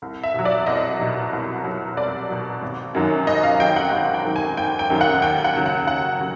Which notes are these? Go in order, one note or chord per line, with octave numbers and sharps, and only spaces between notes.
C2
E5
B2 F#3
D5
C2 D#5
B2 F#3
C2
B2 F#3
C2 D5
B2 F#3
G#1
F#2 D#3 F#3
G#1 D#5
F5
F#2 D#3 F#3 G5
F#5
G#1 F#5
G5
F#2 D#3 F#3
G#5
G#1 G5
G5
F#2 D#3 F#3
F#5
D#2 G5
F#5
C#3 F#3
F#5
D#2 F#5
C#3 F#3